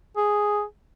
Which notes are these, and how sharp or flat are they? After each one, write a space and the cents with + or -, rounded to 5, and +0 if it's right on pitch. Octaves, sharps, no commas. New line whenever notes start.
G#4 +0